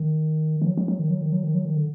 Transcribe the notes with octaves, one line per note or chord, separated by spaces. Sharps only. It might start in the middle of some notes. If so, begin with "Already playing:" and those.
Already playing: D#3
D#3
F#3
F#3
F#3
D#3
F#3
D#3
F#3
D#3
F#3
D#3
D3